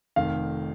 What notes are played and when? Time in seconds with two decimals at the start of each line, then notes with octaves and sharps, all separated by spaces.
0.16 F1 F2 D#3 F5